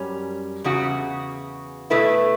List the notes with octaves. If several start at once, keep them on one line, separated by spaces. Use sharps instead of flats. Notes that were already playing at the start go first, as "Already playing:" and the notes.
Already playing: F#2 G3 C#4
E2 C#3 F#4
B2 A3 E4 B4